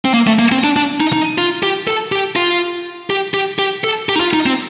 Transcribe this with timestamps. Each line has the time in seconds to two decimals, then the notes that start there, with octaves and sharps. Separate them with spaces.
0.05 C4
0.14 A#3
0.27 A3
0.39 A#3
0.52 C4
0.64 D4
0.76 D4
1.00 D#4
1.13 D#4
1.38 F4
1.63 G4
1.87 A4
2.12 G4
2.36 F4
3.10 G4
3.34 G4
3.59 G4
3.84 A4
4.09 G4
4.16 D#4
4.20 F4
4.33 D#4
4.46 C4